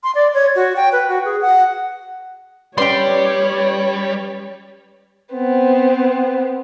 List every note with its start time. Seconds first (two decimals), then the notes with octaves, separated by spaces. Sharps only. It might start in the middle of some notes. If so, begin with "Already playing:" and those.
0.03 C6
0.15 D5
0.34 C#5
0.55 F#4
0.76 G5
0.92 B4
1.09 F#4
1.25 G#4
1.42 F#5
2.78 G3 C#4 B4 C#5 D5 G5 C6
5.33 B3 C4